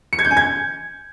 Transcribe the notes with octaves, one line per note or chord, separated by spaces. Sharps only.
C#7
G#6
G6
G#5
G#6